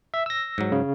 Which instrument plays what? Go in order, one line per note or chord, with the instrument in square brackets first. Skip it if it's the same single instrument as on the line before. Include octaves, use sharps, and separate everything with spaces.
[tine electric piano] E5
E6 A#6
[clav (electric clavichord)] G#2 F#3
[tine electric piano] C#3